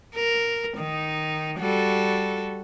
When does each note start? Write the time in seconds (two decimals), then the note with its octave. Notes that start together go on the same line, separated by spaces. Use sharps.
0.15 A#4
0.77 D#3 D#4
1.59 G3 F#4 A4